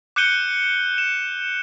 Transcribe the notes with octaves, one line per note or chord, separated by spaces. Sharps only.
D6 F#6 G6 C#7 D#7 G7
E7